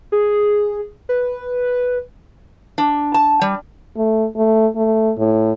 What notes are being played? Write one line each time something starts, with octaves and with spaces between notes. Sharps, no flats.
G#4
B4
D4
A5
G3
A3
A3
A3
A2